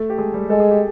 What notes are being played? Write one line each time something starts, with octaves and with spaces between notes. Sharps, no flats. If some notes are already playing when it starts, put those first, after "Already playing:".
Already playing: A3 A4
G4
G#3 G#4
G3 G4
G#3 A4
G#4
G4